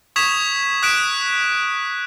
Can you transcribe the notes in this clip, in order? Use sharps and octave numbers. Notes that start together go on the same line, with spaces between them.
C#6 D#6 G#6 B6 E7 F7
D#6 F#6 B6 D7 E7